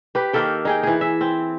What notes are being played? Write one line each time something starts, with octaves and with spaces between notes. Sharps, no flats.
G4 B4
D#3 A#3 A4 G5
D#4 G#4 G5
E3 G#4
E5
C4